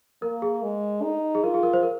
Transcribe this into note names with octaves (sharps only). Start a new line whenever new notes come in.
A#3 A#4
G#4
G#3
D#4
G#4
F4 A#4
G#4
A#4
C5
A#4